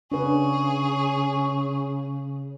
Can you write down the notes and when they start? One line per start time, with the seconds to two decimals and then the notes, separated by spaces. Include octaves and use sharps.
0.12 C#3 D4 G#4 B4 C#6